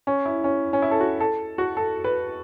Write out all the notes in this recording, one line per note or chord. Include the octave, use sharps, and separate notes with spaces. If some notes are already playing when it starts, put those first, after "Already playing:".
C#4
E4
C#4
C#4
E4
A4
F#4
A4
F#4
A4
B4